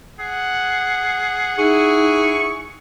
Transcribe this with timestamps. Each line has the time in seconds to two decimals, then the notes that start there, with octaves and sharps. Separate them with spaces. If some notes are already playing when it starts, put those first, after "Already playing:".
0.19 G#4 F#5
1.58 D#4 E4 G#4 C#6